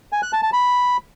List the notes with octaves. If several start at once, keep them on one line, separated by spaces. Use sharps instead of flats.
G#5
F#6
A5
A5
B5